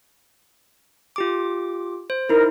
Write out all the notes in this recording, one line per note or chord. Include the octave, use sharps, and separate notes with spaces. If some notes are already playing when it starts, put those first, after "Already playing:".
F4 G4 D6
C5
D#4 E4 A#4